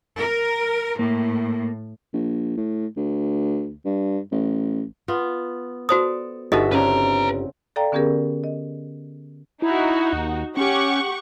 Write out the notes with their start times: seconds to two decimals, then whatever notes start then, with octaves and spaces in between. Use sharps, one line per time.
0.18 A#4
0.99 A2 A#3
2.13 A#1
2.57 A2
2.96 D2
3.85 G2
4.31 A1
5.08 B3 F4
5.89 F#4 A4 C5 D5 D#6
6.52 G1 D#4 F#4 A4 D#5 E5
6.72 C#3 C4 D4 B4 A#5
7.76 A4 D5 F5 G5 A#5
7.92 D3 B3 C#4 G4 G#4 A#4
8.44 D#5
9.62 D#4 E4 F#4
10.13 D#2
10.57 C#4 G4 F#5 C#6